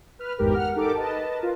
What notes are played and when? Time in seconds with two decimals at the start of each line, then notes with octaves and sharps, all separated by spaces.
0.19 B4 F6
0.38 G#1 E2 G#2 G4 A#4
0.54 F#5 F6
0.76 D#4 G4 A4 A#4 D6
0.95 B4 D#5 A5
1.39 F4 A#4